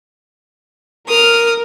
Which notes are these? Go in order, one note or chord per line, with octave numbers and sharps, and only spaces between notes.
A#4 D#6 F6